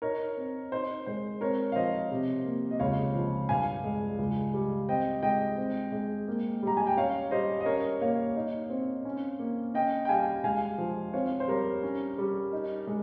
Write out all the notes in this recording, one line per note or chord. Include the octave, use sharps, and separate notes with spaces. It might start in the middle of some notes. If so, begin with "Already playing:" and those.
D#4 A#4 C#5
C4
D#4 C5
G#3 C5
C4 A#4 C#5
F5
F3 C5 D#5
C3
A#3
D#5
C#2 C#5 F5
F3
G2 F5 G#5
G#3
C#2
G3
C4 D#5 G5
G#3 D#5 G5
C4
G#3
A#3
G3 A#5
G#5
G5
C#4 C#5 F5
G3 C5 D#5
D#5
C#4 A#4 C#5
A#3 C#5 F5
D#4
C4
C#4
A#3
C#4 D#5 G5
G5
G3 F5 G#5
G#3 F5 G#5
F3
C4 C#5 F5
C5
G3 A#4 C#5
C#4
G3
D#4
G#3